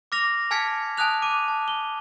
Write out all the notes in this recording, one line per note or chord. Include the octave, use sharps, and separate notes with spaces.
D6 F6 A#6 F7
G#5 A5 F6 G#6 B6 C#7
G#5 A5 D#6 F#6 F7
D6 D#7
A5
G7